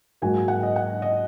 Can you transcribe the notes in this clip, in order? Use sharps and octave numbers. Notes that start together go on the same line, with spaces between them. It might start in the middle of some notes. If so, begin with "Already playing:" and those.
G#2 F#3 A#3 F#4 G#5
F#5
D#5
F#5
D#5